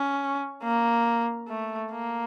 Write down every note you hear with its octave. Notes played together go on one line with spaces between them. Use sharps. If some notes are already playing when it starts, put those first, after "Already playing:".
Already playing: C#4
A#3
A3
A#3